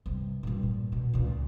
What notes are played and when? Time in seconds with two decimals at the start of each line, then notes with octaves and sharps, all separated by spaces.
0.06 G2 C3
0.43 G2 A#2
0.63 A#2
0.92 B2
1.14 C#2 A#2